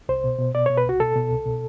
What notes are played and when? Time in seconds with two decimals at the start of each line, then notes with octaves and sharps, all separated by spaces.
0.09 C2 C5
0.24 B2
0.39 B2
0.55 B2 D5
0.66 B2 C#5
0.77 B4
0.85 C2 F#4
1.00 B2 A4
1.15 B2
1.31 C2
1.46 B2